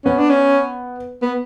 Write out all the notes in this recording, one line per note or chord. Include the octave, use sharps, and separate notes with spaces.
B3 C#4
D4
C#4
B3